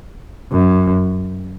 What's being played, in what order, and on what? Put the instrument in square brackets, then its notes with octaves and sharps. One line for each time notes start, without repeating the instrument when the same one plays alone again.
[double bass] F#2